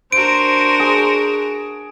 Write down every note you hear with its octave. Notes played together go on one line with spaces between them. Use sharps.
D4 F#4 A#4 C5 D7
G#4